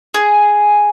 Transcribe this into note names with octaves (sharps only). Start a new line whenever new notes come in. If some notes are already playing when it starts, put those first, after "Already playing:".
G#4